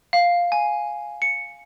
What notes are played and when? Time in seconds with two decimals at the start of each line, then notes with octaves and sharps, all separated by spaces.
0.13 F5
0.52 G#5
1.22 C#7